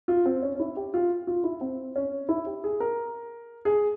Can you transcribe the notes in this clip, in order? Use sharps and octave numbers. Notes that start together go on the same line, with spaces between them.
F4
C4
C#4
C#4
E4
G4
F4
F4
E4
C4
C#4
E4
G4
G#4
A#4
G#4